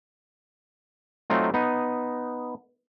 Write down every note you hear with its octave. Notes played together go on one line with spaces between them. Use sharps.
F#3 A3 C4 D#4 F4
B3 D#4